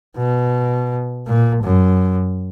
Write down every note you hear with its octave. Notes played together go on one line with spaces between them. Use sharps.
B2
A#2
F#2